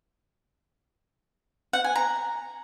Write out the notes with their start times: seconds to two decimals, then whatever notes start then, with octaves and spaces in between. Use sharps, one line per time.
1.73 F#5
1.84 G#5
1.96 A#5